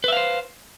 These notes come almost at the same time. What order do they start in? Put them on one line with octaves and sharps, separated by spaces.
B4 E5 F5 C5